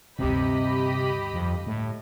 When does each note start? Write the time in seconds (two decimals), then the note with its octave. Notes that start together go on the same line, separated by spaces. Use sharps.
0.19 D2 G2 C3 G4 D#5 B5
1.34 F2
1.67 A2